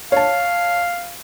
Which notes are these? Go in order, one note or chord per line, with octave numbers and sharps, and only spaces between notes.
C#5 F5 A5